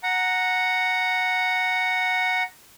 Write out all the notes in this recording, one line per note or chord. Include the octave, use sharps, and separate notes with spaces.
F#5 A#5